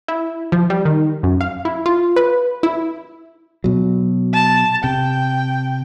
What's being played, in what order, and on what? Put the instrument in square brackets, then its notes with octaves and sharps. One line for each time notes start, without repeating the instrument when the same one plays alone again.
[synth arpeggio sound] E4
F3
G3
D#3
F#2
F5
E4
F4
B4
E4
[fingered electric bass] B2 F#3
[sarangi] A5
[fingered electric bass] C3 [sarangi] G5